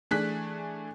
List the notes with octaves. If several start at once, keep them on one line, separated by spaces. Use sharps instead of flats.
E3 A3 D4 G#4 F#6 B6